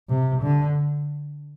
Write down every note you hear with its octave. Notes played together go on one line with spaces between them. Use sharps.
C3
D3